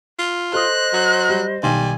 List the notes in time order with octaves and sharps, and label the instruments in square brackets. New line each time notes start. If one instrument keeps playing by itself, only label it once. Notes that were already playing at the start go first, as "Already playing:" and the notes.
[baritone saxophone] F4
[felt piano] A4 C6 D#6 [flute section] C5 D#5 [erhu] F#6
[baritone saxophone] F#3
[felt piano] G3
[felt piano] B1 D#3 C6 [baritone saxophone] G3 [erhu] G#5